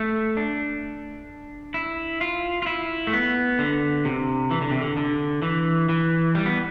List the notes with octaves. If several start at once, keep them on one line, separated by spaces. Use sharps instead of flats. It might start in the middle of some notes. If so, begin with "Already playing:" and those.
Already playing: A3
D4
E4
F4
F4
E4
A3
B3
D3
C3
E3
D3
C3
D3
D3
E3
E3
G3
B3